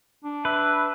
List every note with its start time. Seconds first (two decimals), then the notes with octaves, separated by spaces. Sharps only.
0.24 D4
0.45 B4 E5